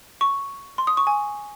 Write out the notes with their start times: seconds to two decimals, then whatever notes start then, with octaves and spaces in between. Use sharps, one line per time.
0.21 C#6
0.78 C6
0.87 D#6
0.97 C#6
1.07 G#5